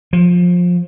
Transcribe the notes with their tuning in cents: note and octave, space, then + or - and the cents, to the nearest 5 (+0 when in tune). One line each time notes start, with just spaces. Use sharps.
F3 +20